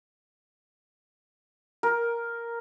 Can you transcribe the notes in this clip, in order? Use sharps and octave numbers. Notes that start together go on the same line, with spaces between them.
A#4